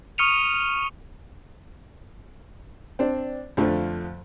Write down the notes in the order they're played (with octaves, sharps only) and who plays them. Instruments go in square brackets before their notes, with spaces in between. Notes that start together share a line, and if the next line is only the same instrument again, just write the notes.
[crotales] C#6 D#6 F6 C#7 D#7 F7
[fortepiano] C4 D4
F2 D3 F3 A3